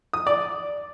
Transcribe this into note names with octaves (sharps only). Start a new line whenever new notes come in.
D#6
D5